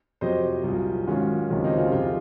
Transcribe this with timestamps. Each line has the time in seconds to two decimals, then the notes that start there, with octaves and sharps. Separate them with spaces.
0.21 F2 C3 F#3 C5 D#5
0.64 C2 A#2 F#3
1.07 G#2 D#3 F#3 C#4 F4
1.49 C#2 C3 D#3 F#3 C#4 F4
1.64 C4 D#4
1.78 C#4 F4
1.92 F2 C3 F3 F4 G#4